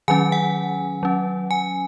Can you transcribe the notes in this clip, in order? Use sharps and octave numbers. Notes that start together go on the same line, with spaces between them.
D#3 F#3 C#4 G#5
F#5
F#3 C#4
G#5